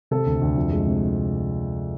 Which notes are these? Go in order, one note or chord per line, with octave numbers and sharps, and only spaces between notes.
C3 A4
D2
D2
F2
G#3
C3